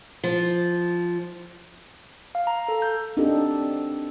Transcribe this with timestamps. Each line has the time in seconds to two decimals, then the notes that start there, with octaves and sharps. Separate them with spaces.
0.24 F3
2.35 F5
2.47 A#5
2.68 A4
2.82 G6
3.17 C4 D4 D#4 F#4 G4 A4